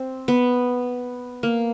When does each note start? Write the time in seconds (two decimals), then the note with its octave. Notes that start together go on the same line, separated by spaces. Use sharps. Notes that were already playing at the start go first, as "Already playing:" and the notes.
Already playing: C4
0.28 B3
1.43 A#3